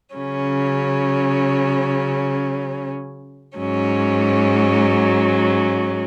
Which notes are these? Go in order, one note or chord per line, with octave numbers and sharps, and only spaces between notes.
C#3 F#3 C#4
G#2 F#3 C#4